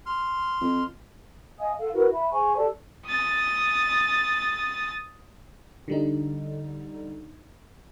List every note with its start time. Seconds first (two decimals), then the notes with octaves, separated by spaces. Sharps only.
0.06 C6 F6
0.61 F2
1.58 D#5 F5 G#5 D#6
1.78 A4 F5 F#5
1.94 E4 F#4 A#4 B4
2.12 E5 B5
2.31 G#4 C5 G#5 C#6
2.57 G4 A4 D5 A5
3.06 D#6 A6
5.88 D3 G3 D#4